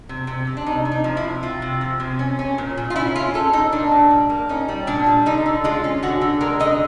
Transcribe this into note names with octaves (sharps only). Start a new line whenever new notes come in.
C3
C3
C3
D4
C3 D#4
C3
D#4
F3
E4
C3
C3 F4
C3
F3
C3
C#4
C#4
A#2
A#2
F4
C#4 E4
C#4 F4
C#4 A4
A#2 D#4
A#3 D4
A#2
G3
A#3
C#4 D#4
G3
A#2 D4
G3
D3 D#4
D3
G#3 F4
C#4
D3 F#4
D3
G#3 A#4
D3 D#5